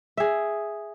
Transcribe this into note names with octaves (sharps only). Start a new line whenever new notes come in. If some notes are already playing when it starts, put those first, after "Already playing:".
G#4 E5